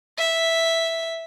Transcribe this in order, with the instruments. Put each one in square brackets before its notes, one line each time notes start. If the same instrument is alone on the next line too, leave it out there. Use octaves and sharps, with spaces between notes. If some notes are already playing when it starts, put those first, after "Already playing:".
[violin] E5